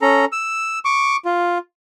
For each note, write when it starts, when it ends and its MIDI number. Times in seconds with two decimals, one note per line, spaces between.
0.02 0.25 61
0.02 0.25 69
0.02 0.25 82
0.32 0.79 88
0.85 1.16 85
0.85 1.16 86
1.25 1.58 65